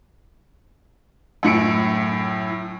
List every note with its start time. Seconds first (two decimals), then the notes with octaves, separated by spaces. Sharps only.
1.43 F#2 A2 C#7 D7